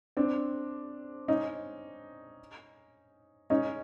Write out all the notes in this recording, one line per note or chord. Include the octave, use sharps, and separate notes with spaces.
C4 D4
C#4 D#4
C#4 D#4